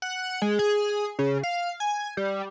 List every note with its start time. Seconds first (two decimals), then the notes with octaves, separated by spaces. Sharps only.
0.02 F#5
0.42 G#3
0.59 G#4
1.19 C#3
1.43 F5
1.80 G#5
2.17 G3